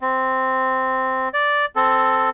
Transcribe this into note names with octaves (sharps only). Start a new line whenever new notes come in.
C4
D5
C4 A4